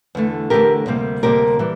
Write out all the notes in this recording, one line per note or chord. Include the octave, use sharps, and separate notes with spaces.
E2 D3 A3
E2 D3 A3 G4 A#4
D2 C3 G3 A#3
D2 C3 G3 A#3 G4 A#4
E3 G3